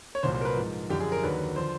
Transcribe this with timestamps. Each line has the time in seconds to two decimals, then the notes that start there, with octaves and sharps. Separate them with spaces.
0.15 C#5
0.23 C2 A#2 F#3 C5
0.34 C5
0.41 A#4
0.45 B4
0.56 G#2 F3
0.89 F#2 D3 F3 G4
1.00 G#4
1.12 A#4
1.23 D#2 D3 F#3 B4
1.56 D3 F3 C5